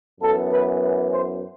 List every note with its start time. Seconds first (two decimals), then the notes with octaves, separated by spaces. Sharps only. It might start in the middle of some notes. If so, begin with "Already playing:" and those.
0.21 F#2 E3 B3 A4
0.50 B4
0.81 B4
1.12 C5